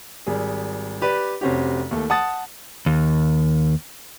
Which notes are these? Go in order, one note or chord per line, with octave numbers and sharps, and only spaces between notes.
G#1 G3 G#4
G4 B4 D5
F1 C4 C#4 F#4 G4
D#2 A3
F#5 A5 D#6 A6
D#2